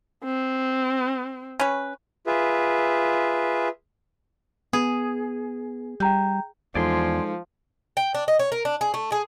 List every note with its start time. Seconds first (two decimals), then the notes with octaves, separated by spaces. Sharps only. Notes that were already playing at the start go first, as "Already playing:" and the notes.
0.24 C4
1.60 C#4 B4
2.27 F4 G#4 B4 E5
4.73 B3 G#4
6.00 G3 G5 A#5 G6
6.75 E2 F3 G#3 D#4 A4 D5 G#5 C6
7.97 G5
8.14 D4
8.28 D#5
8.39 C#5
8.52 A#4
8.65 D4
8.81 G#4
8.94 A3
9.12 G#4